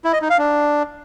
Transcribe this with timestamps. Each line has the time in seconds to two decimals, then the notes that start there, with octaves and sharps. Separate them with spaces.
0.04 E4
0.13 D#5
0.21 D#4
0.30 F5
0.38 D4